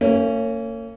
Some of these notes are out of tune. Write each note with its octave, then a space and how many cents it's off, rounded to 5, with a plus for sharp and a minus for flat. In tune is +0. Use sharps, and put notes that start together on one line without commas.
A#3 -40 C#4 +0